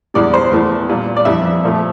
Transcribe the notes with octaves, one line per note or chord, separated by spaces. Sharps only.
E2 E3 G3 D5
C5
E2 E3 A3
A#2 G3
D5
F2 E3 G3 E5
A#2 F3 A3